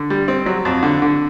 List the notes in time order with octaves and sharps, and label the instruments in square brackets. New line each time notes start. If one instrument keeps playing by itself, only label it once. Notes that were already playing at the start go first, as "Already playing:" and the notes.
Already playing: [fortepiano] D3
G3
C4
F#3
F2
D3
D3